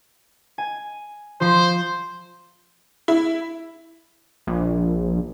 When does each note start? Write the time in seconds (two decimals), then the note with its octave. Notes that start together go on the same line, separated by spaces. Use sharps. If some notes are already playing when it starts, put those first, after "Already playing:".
0.58 G#5
1.41 F3 C5 C6
3.08 E4
4.47 A#1